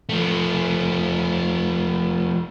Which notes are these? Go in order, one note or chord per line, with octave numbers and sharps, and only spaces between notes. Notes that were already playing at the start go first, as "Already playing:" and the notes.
F3 A3